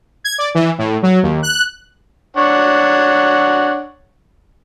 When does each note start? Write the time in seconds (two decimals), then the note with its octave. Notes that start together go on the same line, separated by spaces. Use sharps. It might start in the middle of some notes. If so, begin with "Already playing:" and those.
0.24 G#6
0.38 D5
0.55 E3
0.78 A2
1.03 F#3
1.23 D#2
1.43 F#6
2.37 D4 C#5 F#5